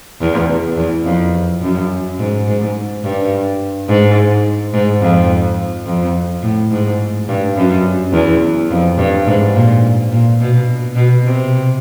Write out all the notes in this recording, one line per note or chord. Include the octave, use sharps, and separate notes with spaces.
E2
E2
F2
F#2
G#2
G#2
G2
G#2
G#2
F2
F2
A2
G#2
G2
F#2
E2
F2
G2
G#2
A#2
A#2
B2
B2
C3